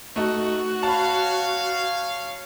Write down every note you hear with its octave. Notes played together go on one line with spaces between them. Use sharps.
A3 D#4 F#4
C#5 F5 A5 B5